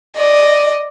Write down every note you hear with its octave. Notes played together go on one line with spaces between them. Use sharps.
D5 D#5